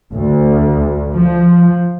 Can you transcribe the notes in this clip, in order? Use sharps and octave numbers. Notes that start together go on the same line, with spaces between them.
D2
F3